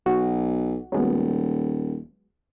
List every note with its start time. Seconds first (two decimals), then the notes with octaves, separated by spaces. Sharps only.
0.06 B1 F#4
0.92 D#1 F#3 G#3 B3